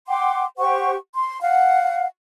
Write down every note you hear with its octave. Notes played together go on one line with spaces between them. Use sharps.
F#5 G5 C6 D6
G4 C5 F#5 C#6
C6
F5 F#5